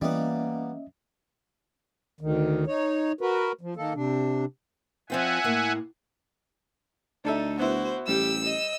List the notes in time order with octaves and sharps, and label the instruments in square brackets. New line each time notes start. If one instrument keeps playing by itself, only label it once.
[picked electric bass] E3 [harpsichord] G3 B3 [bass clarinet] A#3 [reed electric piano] C#4 D#5 E5
[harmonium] D2 D#3
D#4 C#5
F#4 A#4 B4
F3
D#3 A#3 A4
C3 D4
[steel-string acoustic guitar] F3 C4 F4 [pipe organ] E5 F#5 G#5
[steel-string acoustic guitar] A2 A#3
[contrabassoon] D2 [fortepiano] D4 A4 E5 [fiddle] D#4
[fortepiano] B3 E4 [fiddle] F#4 [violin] C5
[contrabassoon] A1 [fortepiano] G3 [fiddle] G4 [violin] E6
[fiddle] D#5